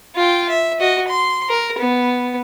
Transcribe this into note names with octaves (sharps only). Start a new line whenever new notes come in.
F4 G5
E5
F#4 D#5
C6
A#4
B3